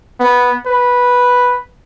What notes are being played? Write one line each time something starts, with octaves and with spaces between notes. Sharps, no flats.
B3
B4